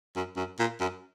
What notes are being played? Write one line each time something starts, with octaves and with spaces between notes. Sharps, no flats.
F#2
F#2
A#2
F#2